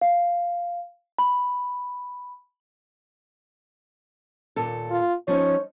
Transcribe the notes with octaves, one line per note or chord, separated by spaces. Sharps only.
F5
B5
D#2 A#2 A4
F4
F3 C#4 D#4 C#5